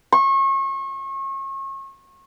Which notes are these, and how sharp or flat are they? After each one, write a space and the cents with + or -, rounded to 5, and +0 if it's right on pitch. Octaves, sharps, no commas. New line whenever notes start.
C#6 -35